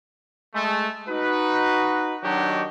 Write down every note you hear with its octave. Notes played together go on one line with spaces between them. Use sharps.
G#3 A3
D#4 F#4 B4
D#3 F#3 D4 D#4 F#4 G4